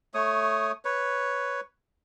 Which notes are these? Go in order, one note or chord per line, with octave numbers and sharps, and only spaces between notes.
A3 C#5 D#6
B4 C#5